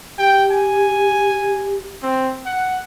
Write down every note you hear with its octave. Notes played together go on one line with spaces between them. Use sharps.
G4 G5
G#5
C4
F#5